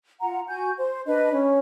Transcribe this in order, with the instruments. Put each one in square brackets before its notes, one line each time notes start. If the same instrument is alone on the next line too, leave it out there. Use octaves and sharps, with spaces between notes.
[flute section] F4 F#5 A#5
F#4 G#5 G6
C5
D4 B4 D#5
C#4 C#5